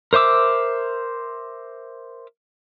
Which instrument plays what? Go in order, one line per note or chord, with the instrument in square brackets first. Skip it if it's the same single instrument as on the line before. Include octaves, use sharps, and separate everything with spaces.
[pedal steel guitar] A#4 C5 E5 D6 E6